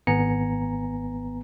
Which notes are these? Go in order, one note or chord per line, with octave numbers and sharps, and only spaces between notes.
G#1 B3 G#5 A#5 C#7